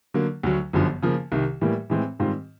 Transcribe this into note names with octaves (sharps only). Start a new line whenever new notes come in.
D3 F#3 A#3
D2 D3 F#3
G1 F#2 D3 F3
C#3 F3 A#3
C2 C3 D#3
A2 E3 G3 A#3
A2 E3 G#3 C4
G#2 D#3 G3 C4 F4